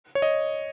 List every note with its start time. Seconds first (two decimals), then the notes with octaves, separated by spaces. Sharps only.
0.15 C#5
0.22 D#5